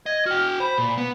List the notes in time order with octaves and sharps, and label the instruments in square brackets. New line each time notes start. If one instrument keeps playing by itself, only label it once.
[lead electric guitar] D#5 [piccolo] G#6
[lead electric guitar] F#4 G5 [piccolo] F6
[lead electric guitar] C5 [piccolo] B5
[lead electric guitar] A#2
B3